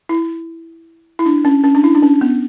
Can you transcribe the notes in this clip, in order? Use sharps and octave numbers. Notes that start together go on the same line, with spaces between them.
E4
E4
D4
C#4
C#4
D4
E4
D4
C#4
B3